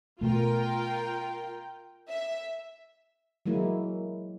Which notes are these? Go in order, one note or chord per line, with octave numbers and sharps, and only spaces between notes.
B2 A3 F4 A#4 G5
E5
F#3 G#3 A#3 E4